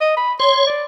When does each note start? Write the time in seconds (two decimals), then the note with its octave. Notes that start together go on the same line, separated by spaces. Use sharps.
0.01 D#5
0.17 B5
0.40 C#5 C6
0.67 D5